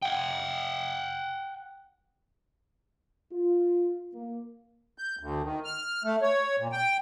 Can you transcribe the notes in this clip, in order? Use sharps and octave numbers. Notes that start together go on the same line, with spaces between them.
F#5 G5
F4
A#3
G6
D2
D#3
F6
A3
C#5
A#2
G5